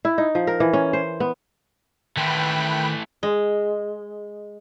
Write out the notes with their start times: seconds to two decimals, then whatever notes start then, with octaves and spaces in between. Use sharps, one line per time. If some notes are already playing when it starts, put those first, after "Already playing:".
0.05 E4
0.18 D#4
0.35 F3
0.47 A#4
0.60 E3
0.73 C#4
0.93 C5
1.20 B3
2.17 D#3 E3 A3 G5 B5 C6 F#6
3.23 G#3